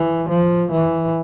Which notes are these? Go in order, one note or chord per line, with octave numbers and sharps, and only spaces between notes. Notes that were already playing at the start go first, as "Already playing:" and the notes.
Already playing: E3
F3
E3